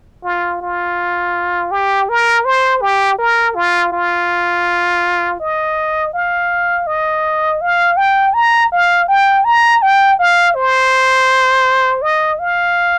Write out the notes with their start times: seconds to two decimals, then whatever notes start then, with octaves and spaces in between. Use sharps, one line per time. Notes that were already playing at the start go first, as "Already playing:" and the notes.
0.24 F4
0.61 F4
1.71 G4
2.09 A#4
2.45 C5
2.81 G4
3.19 A#4
3.55 F4
3.92 F4
5.40 D#5
6.14 F5
6.87 D#5
7.61 F5
7.97 G5
8.34 A#5
8.72 F5
9.08 G5
9.45 A#5
9.82 G5
10.19 F5
10.55 C5
12.02 D#5
12.39 F5